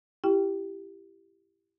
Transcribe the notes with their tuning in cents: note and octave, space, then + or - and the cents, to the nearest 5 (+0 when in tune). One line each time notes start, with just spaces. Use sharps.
E4 +25 G4 +0 G5 -5